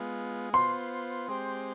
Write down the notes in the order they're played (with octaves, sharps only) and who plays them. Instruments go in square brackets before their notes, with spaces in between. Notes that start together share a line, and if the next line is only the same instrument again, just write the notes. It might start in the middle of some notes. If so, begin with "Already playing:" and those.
Already playing: [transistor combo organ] G#3 B3 F4
[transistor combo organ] B3 F4 C5 [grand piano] C6
[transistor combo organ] G#3 C4 G4 C5